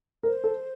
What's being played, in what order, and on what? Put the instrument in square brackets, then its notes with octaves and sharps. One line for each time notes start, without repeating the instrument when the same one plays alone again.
[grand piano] A#4 [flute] C5
[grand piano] A4